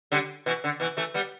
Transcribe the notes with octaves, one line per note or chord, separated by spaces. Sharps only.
D3 G3
B2 E3
D3
B2 E3
E3 A3
G3 B3